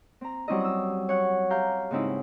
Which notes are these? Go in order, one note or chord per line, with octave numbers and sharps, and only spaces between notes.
C4 A#5
F#3 G3 C4 C#4 E4 D#5
D#6 E6
C#5 F#5
G4 F5 A#5 G6
G#2 C#3 C4 D#4 E4